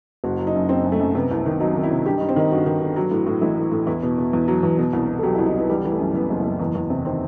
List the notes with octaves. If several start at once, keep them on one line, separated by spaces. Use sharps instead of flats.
F#1 F#4
F#3
D#4
F#2
F#1 C4
F#2
A3
F#2
C3 B3
C2
D#3
F#3 D#4
D#3
E4
C3
G2 G4
G2 D#4
C4
D#3 D#4
G1 F#4
D#3
G1
F#3
A2
A2
A1 E4
A2
A2
E2 E4
B2
B2
E2
F#3
E2
B2
C2
B2
A4
F#3 G4
E4
C2
D#4
C2 B3
E3 G3
E3
A3
F#2
E3 B3
F#1
F#1
E2
E2
C3
D#3 C4